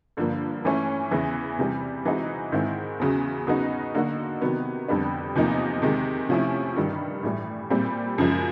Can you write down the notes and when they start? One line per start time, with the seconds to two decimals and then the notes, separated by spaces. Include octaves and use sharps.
0.17 G2 D3 F3 A#3
0.65 E3 A3 C#4
1.11 E2 C#3 E3
1.59 C3 E3 G3
2.05 E3 G#3 C4 D#4 F#4
2.52 G#2 D#3 G#3 C4 E4
3.00 E2 C#3 F#3
3.47 C#3 F#3 B3 D#4 F#4
3.95 D3 F#3 A#3 D#4 F#4
4.41 C3 D#3 F#3 B3
4.88 F2 D3 G3 B3 D4
5.35 E2 C3 F3 A#3 D#4
5.82 C3 D#3 G#3
6.29 C3 F3 A3 C#4 E4
6.76 G2 D#3 G3
7.23 A2 E3 G3
7.70 A#2 G3 C4
8.18 F#2 C#3 F3 G#3